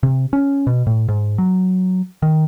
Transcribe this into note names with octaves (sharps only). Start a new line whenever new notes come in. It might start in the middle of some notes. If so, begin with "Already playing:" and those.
C3
C#4
B2
A2
G#2
F#3
D#3